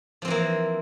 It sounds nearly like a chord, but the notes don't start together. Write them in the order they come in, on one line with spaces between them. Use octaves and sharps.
F3 C4 E3 A#3